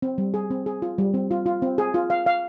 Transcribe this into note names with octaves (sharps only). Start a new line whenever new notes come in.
C4
G3
G#4
C4
G#4
F4
G3
C4
F4
F4
C4
G#4
F4
F5
F5